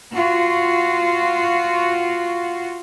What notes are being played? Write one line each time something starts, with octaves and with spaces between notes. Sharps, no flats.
F4 F#4